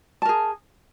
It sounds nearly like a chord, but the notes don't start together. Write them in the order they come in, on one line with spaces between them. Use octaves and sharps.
A5 A#4 G#4